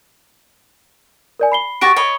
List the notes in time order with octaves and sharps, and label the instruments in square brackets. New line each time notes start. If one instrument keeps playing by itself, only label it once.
[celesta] A#4 D5 G#5
B5 C7 G7
[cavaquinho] F#4 G4 C#6 [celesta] A6 A#6 D7
[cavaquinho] C#5 D#5 B5